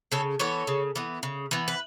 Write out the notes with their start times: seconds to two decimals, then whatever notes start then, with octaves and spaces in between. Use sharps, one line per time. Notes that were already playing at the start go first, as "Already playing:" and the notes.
0.12 C#3 A4 C#5
0.39 E3 B3 A4 C#5
0.67 C#3
0.96 E3 B3
1.23 C#3
1.51 E3 B3
1.68 B4